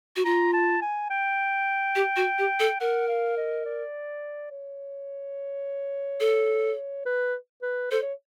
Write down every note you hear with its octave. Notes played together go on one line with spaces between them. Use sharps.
F#4
F4 A#5
A5
G#5
G5
G4
F#4
G4
A4
A#4 F#5
F5
D#5
D5
C#5
A4
B4
B4
A4 C5
C#5